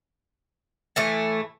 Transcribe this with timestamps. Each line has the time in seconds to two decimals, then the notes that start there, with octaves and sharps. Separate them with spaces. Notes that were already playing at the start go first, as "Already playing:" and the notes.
0.96 A2 E3 A3